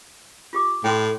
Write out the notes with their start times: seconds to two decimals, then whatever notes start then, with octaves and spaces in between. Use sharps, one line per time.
0.53 F4 G4 D6
0.84 A2 G5 C6